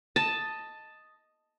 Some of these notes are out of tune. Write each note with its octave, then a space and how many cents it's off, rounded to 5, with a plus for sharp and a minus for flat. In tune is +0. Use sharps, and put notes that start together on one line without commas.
D#5 +0 A5 +5